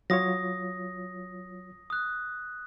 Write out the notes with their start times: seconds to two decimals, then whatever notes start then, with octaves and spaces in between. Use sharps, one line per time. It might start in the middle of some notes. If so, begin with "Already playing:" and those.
0.10 F#3 F4 C#5 D#6 A#6
1.90 D#6 F#6